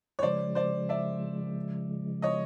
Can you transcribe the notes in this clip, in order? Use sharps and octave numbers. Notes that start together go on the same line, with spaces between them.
C#5
C#3 F3 G#3 C5 D5
C5 D5
D5 E5
C#5 D#5